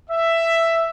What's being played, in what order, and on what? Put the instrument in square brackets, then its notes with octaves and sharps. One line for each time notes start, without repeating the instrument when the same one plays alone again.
[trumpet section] E5